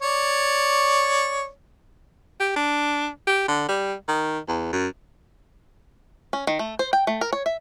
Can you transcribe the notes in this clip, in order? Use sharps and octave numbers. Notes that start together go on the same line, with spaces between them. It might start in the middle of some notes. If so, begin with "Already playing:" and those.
C#5 D5
G4
D4
G4
D3
G3
D#3
E2
F#2
C#4
D#3
A3
C5
G5
A3
A#4
C#5
E5